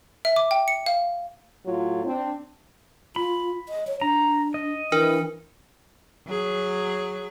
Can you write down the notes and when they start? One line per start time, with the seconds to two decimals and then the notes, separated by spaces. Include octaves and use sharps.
0.25 E5
0.36 D6
0.51 G5
0.68 C#7
0.86 F5
1.65 A2 F#3 F4
2.05 C4 D4
3.16 F4 B5
3.69 D#5
3.87 C#5
4.01 D4 A#5
4.54 D#5
4.92 E3 D4 A#4
6.28 F#3 G#4